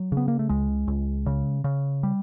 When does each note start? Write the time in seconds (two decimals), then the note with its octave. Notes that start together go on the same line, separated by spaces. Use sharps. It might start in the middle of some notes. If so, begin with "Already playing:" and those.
Already playing: F#3
0.12 C#3 B3
0.28 A#3
0.39 A3
0.49 C#2 G#3
0.88 C#2
1.26 C#3
1.64 C#3
2.03 G3